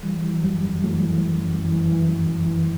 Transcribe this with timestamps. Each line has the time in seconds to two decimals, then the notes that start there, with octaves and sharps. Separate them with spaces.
0.03 E3 G3
0.23 E3
0.34 F#3
0.43 F#2 G3
0.64 F#2
0.84 E3 F#3 A3
1.05 E3
1.25 F#2
1.45 F#2
1.65 E3
1.85 E3
2.06 F#2
2.26 F#2
2.46 E3